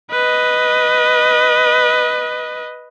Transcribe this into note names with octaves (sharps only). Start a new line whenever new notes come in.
B4 D#5